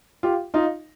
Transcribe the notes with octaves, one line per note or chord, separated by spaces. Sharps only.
F4 G4
D#4 F4